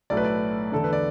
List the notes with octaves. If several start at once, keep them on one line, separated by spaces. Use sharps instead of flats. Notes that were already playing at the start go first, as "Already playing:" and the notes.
B1 A2 A3 D5
B4
D5
E2 D3 A3 D4 A4
B4
D5